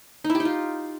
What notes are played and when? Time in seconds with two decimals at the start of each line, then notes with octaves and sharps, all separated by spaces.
0.24 D#4
0.30 E4
0.35 G4
0.40 D#4
0.45 F4